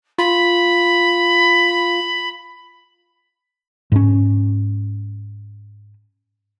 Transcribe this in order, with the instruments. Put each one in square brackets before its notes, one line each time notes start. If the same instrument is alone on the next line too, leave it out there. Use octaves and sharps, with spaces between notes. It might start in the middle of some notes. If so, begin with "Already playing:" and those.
[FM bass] F4 [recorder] B5
[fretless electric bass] G#2 C#4